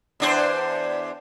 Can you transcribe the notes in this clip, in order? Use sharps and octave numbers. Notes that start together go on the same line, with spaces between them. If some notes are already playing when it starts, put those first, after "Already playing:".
E2 D4 C5